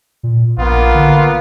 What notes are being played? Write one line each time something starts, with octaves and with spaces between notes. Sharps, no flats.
A#2
A#1 A#3 B3 F4
D3